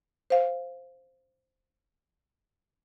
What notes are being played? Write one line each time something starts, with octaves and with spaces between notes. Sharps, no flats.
C5 F5